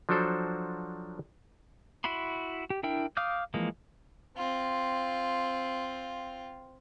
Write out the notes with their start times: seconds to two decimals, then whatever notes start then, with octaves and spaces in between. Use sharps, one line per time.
0.09 F3 F#3 D4 F#4 A4 C5
2.04 E4 F#4 B5 C6
2.70 G4
2.83 D4 E4 A#4 G5
3.17 F5 D6 D#6 F6 G6
3.54 E3 F3 G#3 A#3
4.36 C4 F4